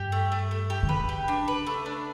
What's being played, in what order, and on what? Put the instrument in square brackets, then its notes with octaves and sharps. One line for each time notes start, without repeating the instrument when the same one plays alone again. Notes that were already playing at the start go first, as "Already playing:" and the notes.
Already playing: [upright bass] G2 [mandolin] G4
[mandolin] A3
A3
A3
G4
[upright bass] D3
[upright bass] C#3 [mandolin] B4
[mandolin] G4
D4
B4
A3
D4